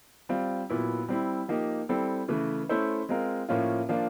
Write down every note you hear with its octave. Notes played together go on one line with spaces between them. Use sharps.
G3 C4 F4
A#2 F#3 B3 E4
G3 C4 E4
F3 A#3 D#4 G4
G3 C4 E4 A4
C#3 E3 A3
A3 C#4 E4 A4 C5
G#3 C4 F4 A#4
A2 F3 A#3 C#4 F4
F3 A#3 D4 F4